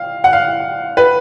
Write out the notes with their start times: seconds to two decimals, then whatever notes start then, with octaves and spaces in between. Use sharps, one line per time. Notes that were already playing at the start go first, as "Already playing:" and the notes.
Already playing: F5
0.24 F#5
0.33 F5
0.97 B4